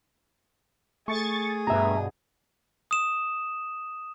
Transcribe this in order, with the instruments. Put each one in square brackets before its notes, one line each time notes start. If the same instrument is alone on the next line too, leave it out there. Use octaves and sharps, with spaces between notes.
[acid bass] A3 [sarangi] G#4 [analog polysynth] C#6 A6
[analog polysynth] G2 B2 [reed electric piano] E5 A#5
[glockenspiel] D#6 E7